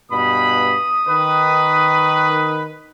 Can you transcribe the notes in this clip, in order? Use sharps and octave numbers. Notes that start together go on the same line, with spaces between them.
G2 B2 B5 D#6
D#3 B4